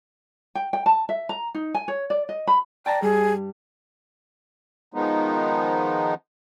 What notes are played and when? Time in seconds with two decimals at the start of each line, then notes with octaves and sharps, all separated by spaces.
0.55 G5
0.73 G5
0.86 A5
1.09 E5
1.29 A#5
1.55 D#4
1.74 G#5
1.88 C#5
2.10 D5
2.29 D#5
2.47 B5
2.86 D5 G5 A5 A#5
3.02 G2 G3 G#4
4.94 D#3 F3 G#3 B3 D#4